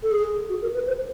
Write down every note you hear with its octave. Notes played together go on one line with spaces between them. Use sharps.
A4
G#4
F#4
A#4
B4
C5